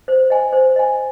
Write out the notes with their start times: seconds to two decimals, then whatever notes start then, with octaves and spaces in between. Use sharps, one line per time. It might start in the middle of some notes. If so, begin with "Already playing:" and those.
0.08 C5
0.30 D#5 G#5
0.53 C5
0.76 D#5 G#5